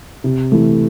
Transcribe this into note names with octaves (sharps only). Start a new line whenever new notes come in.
C3
E3 A3 E4